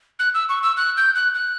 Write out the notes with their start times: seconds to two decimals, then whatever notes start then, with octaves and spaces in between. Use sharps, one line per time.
0.19 F#6
0.34 E6
0.49 C#6
0.63 E6
0.77 F#6
0.97 G6
1.15 F#6
1.35 F#6